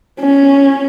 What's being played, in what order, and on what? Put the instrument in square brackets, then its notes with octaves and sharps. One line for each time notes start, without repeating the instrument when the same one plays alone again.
[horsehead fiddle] C#4